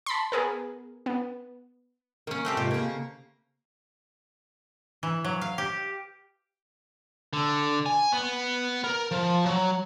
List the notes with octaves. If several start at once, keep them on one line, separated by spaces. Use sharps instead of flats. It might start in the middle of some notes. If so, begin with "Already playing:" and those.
A5 B5 C6
B3 G#4 A#4
B3
D#3 A#3 C#4
A3 C4 G4
G#2 C3 F4 G4
C#3 A#3
E3
F#3
F5
G4
D3
G#5
B3
A#4
F3
F#3